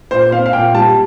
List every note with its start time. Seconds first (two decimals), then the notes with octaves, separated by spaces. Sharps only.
0.11 A#2 C5
0.32 C4 F5
0.46 F5
0.53 A#2 G5
0.74 G3 A5